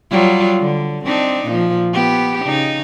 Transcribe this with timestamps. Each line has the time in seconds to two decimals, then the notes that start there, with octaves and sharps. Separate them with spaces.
0.10 F#3 G3 F4
0.59 D3
1.05 C4 D4 D#4
1.47 A#2 F3
1.93 B3 G4
2.45 C#3 D#4